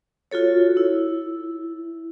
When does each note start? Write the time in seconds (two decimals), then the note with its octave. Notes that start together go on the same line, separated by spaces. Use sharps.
0.31 F4 F#4 A4 C#5
0.77 E4